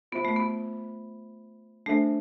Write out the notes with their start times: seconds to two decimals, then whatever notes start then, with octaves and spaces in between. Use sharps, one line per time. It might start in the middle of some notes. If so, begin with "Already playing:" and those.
0.12 B3 F4 C5 E5 B5
0.25 A3
0.36 B3
1.86 A3 D4 A4 C5 E5